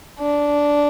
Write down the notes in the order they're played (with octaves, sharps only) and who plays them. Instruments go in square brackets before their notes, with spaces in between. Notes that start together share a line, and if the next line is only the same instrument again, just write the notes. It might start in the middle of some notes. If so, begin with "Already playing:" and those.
[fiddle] D4